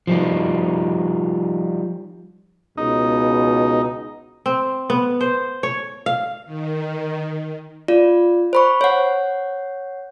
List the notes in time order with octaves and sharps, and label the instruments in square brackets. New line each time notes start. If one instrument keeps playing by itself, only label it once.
[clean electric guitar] F3 G3 D#4
[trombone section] C#2 B2 [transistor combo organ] D#4
[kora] C4
B3
C5
C#5
F5
[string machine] D#3
[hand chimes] F4 D5
C5 B5 C#6
C#5 F#5